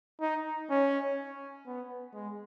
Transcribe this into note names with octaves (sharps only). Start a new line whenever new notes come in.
D#4
C#4
B3
G#3